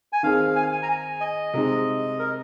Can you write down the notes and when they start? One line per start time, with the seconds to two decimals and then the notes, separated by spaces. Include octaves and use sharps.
0.13 G#5
0.23 D#3 C4 G#4 F5
0.56 G#5
0.63 F5
0.72 G#5
0.83 A#5
0.89 G#5
1.20 D#5
1.54 C3 G#3 D#4
2.19 A#4